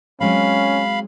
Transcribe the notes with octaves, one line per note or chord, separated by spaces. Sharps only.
F#3 G#3 C4 C#4 F5 B5